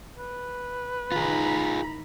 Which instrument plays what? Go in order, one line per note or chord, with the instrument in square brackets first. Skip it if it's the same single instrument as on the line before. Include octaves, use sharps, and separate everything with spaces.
[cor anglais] B4
[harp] A1 D#3 [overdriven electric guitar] F4 G#4 [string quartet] A#5 B5